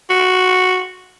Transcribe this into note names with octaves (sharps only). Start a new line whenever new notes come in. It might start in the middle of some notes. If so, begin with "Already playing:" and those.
F#4